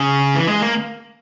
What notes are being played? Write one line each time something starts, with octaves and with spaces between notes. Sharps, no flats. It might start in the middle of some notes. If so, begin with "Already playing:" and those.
Already playing: C#3
E3
G#3
A#3